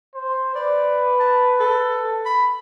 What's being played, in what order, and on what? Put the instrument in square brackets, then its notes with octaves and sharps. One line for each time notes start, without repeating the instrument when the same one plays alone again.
[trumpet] C5
[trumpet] B4 [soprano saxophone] D5
[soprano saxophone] A5
A4
B5